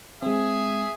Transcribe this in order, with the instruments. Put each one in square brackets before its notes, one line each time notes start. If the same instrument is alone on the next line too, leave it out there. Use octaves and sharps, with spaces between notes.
[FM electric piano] G#3 C4 [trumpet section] G#4 E5